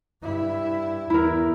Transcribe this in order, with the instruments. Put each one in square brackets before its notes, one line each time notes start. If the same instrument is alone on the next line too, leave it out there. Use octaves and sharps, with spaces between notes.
[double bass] G2 E4
[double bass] E2 [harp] E4 A#4